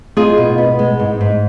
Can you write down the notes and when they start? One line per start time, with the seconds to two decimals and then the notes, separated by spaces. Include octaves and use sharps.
0.17 D#4 F4 G#4
0.38 B2
0.58 B3
0.79 G#3
1.00 G#2
1.21 G#2